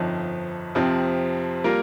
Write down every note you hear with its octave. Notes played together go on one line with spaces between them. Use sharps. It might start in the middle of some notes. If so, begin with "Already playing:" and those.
Already playing: G1 F2 F3 D#4
F2 C3 F3 C4
G3 A#3 F4 A#4